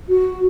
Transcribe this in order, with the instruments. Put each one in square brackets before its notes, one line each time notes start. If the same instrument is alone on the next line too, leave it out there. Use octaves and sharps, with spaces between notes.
[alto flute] F#4